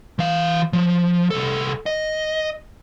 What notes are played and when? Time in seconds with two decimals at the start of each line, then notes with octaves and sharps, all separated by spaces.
0.19 E3 F5
0.73 F3
1.31 C2 A4
1.86 D#5